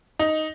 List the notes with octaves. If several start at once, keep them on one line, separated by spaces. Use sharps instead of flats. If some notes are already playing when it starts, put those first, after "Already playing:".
D#4